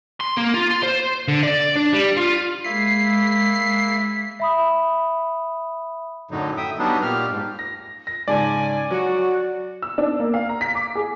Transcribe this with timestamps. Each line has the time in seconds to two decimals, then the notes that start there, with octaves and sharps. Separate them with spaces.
0.20 C6
0.37 A#3
0.54 F4
0.71 C6
0.83 C5
1.28 D3
1.43 D5
1.77 D4
1.94 G3
2.17 F4
2.64 G#3 A#3 E4 B6 C7
4.40 E5 B5 D#6
6.31 F#2 A2 D3 F#3 D#4
6.57 E5 G5 D#6
6.79 F#3 G3 B3 D4 D#4
7.02 A#2 A#3 G4 F6
7.30 G#2
7.59 A#6
8.07 A#6
8.28 G#2 C#3 D5 G#5 A5
8.91 F#3 F#4
9.82 E6
9.98 D4
10.20 A#3
10.34 F5
10.49 A#5
10.61 B6
10.75 D6
10.95 G#4